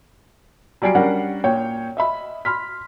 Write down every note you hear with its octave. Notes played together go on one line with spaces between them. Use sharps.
F#3 G3 D5 G#5 C7 D7
G3 C#4 D4 A#4 F#5
A#2 C#5 G5
D#5 E5 B5
B5 C6 F6 B6